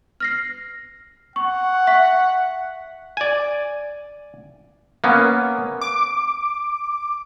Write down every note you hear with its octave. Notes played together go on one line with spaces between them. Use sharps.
F6 A#6 C7
F#5 C#6
E5 C#6 B6
D5 G#5
A#3 B3 C#4
D6